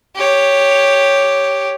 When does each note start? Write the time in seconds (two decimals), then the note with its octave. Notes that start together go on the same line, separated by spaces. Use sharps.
0.15 G4 C#5